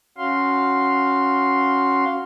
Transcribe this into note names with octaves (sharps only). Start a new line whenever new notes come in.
C#4 F#4 F5 C6